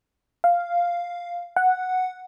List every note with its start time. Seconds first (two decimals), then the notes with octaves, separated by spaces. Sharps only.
0.44 F5
1.56 F#5